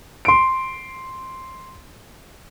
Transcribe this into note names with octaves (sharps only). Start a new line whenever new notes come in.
C6 D7